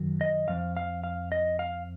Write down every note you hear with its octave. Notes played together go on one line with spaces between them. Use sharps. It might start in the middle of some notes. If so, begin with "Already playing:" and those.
Already playing: F#2 D#3 F#3
D#5
F2 F3 F5
F5
F5
D#5
F5